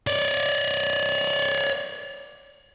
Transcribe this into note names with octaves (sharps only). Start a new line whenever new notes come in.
C#5 D5